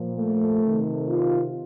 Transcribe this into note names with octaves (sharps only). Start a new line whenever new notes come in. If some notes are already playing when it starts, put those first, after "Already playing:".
Already playing: A#2 F3
A3
C3 D#3
F4